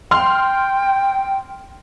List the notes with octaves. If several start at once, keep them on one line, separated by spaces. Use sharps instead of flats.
G5 C6 F6